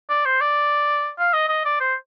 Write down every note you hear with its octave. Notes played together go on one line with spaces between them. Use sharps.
D5
C5
D5
F5
D#5
D#5
D5
C5